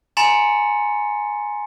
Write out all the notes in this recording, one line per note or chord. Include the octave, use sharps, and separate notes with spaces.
G#5 A#5 C6 A6 C#7